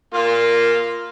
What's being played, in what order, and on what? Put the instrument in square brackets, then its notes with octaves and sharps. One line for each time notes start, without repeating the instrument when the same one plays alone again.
[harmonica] A#3 F4